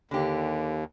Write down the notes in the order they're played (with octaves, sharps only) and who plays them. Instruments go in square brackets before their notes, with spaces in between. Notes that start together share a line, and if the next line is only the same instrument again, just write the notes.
[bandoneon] D#2 [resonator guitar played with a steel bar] D3 G4